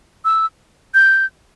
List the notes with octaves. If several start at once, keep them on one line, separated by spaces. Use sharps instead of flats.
E6
G6